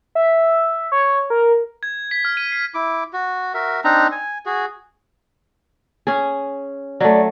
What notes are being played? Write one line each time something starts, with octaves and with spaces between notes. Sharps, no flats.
E5
C#5
A#4
G#6
B6
F6
D#7
C7
E4 D6
F#4
F#4 A#4 E5
C4 D4 D#4 A#5
G#5
F#4 G#4
C#4 G#4
F#3 A3 D5